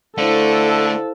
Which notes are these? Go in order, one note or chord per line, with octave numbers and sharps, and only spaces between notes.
D3 A3 E4 A4 C5 F5